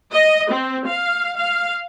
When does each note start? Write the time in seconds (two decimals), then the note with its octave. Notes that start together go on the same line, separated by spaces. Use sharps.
0.13 D#5
0.51 C4
0.87 F5
1.37 F5